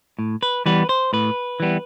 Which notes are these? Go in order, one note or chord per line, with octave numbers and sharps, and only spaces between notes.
A2
B4
E3 G3 B3 B4
C5
A2 B4
E3 G3 B3